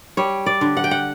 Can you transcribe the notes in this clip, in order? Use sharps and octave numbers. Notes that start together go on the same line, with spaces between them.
G3 C#5
D5
D3
F#5
G5
F#5